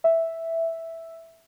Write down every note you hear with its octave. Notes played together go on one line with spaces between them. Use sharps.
E5